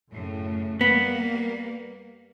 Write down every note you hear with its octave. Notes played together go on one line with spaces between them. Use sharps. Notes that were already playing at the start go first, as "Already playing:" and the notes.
F#2 A2 C#3
G3 A#3 B3